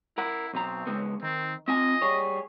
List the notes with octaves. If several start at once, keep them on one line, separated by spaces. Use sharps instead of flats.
E4 A#4 F#5
B1 B2 C4 A#5
C#3 G#3 B3
D#3 C4
C4 F4 D#5 G#5
G3 G#4 C#5